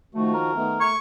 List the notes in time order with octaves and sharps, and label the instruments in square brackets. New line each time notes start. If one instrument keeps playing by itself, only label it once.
[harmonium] D#3 F3 F#4 [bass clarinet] A3
[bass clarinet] A#4
[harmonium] D#3 A3 B3
[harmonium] A3 [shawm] C#6